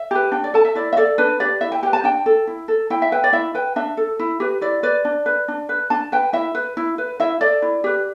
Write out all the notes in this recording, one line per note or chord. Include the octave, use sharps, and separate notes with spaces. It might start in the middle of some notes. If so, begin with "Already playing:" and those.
Already playing: E5
G4 B4
D4 G5
D5
A4 A5
E5
E4 D5
E5
A4 D5
D4 B4
G4 B4 D5
E4 E5
G5
G4 B4 G5
A5
D4 G5
A4
E4
A4
E4 G5
E5
B4 G5
D5
E4 E5
B4 G5
D4 E5
A4
E4
G4 B4
E4 D5
B4 D5
D4
B4
D4
B4
D4 A5
B4 G5
E4 E5
B4
E4
B4
E4 E5
A4 D5
E4
G4 B4